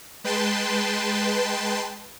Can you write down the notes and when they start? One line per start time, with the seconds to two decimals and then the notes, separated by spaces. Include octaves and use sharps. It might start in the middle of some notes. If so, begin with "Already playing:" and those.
0.24 G#3 B4 G5 A5 C6